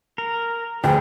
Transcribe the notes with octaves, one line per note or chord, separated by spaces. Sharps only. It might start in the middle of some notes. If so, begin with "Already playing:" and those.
A#4
D2 D3 F3 G#4 B4 G5